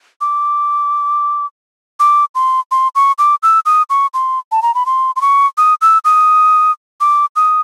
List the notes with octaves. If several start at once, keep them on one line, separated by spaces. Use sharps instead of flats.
D6
D6
C6
C6
C#6
D6
E6
D#6
C#6
C6
A5
A#5
B5
C6
C6
C#6
D#6
E6
D#6
D6
D#6